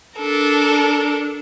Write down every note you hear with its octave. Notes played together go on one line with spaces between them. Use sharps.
D4 A4 A#4